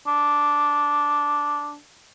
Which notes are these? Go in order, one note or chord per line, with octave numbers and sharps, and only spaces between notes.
D4